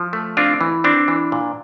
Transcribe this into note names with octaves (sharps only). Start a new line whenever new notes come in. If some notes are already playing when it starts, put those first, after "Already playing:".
Already playing: F3
A3
C4 D4 F4
E3
C4 D4
E3
A#2